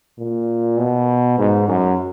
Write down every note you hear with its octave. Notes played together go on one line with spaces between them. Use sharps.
A#2
B2
G#2
F#2